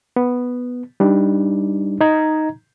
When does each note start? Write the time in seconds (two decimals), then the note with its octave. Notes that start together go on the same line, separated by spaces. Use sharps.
0.16 B3
1.00 G3 D4 D#4
2.01 D#4 D#5 A#5 G#6